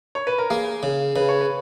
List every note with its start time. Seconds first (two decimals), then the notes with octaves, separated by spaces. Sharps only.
0.15 C#5
0.27 B4
0.38 A#4
0.50 A#3 G#4
0.83 C#3
1.16 C#3 B4
1.29 C#5
1.41 B4